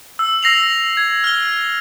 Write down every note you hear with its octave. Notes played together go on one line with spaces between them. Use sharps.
E6
E6 A#6 C7 F7
G#6
F6 G7